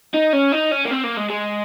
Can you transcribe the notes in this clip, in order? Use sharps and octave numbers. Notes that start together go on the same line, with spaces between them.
D#4
C#4
D#4
C#4
A#3
C4
A#3
G#3
G#3